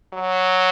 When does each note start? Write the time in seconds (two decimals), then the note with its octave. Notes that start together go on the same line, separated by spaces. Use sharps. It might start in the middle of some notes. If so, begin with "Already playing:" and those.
0.13 F#3